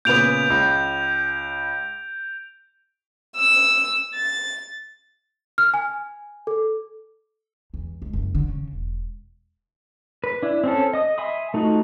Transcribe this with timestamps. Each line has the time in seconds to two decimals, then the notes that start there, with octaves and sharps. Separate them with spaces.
0.05 A#2 C#3 B3 G6 D7 F7
0.50 C#2
3.36 E6
4.15 A6
5.58 F6
5.74 G#5
6.47 A4
7.74 E2
8.02 C#2
8.13 F#1
8.35 D3
8.49 C#3
8.73 E1
10.24 B4
10.43 D4 E4
10.64 C4 C#4 A4
10.93 D#5 D#6
11.18 E5 G#5 B5 C6 D#6
11.54 A3 D#4 F4 F#4